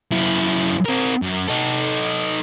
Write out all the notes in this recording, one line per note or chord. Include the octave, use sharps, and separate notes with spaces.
F#2 E4
C4 A#4
F#2
D#4 A4